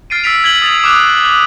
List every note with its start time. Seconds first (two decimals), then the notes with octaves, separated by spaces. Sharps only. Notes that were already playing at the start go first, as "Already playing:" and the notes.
0.10 F6 A6 C7 D7 D#7
0.24 E6 F6 A6 B6 D7 F7
0.44 G#6 B6 F#7 G7
0.62 D#6 A6 F7
0.84 D6 D#6 F6 F#6
1.24 F#6